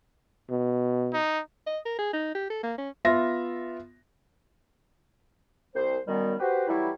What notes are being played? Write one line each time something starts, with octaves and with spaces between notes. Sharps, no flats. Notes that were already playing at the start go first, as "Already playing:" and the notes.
B2
D#4
D#5
A#4
G#4
D#4
G4
A4
A#3
C#4
B3 F4 E5 A#6
C2 C5
F#2 D#3 G3 B3
F#4 G4 B4 C5
E3 F#3 G3 A3 E4